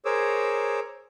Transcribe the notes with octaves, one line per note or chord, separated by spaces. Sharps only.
G#4 A#4 C5 C#5 D6 E6